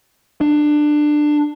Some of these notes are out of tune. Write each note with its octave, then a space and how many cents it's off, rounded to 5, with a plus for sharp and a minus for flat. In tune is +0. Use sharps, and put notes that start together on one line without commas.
D4 +20